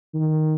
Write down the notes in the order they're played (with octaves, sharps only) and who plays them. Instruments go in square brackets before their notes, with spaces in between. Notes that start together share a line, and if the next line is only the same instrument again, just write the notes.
[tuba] D#3